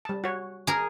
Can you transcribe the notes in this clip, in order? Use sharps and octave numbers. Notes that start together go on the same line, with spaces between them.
G3 A5
F#4 C#5
G#4 A#4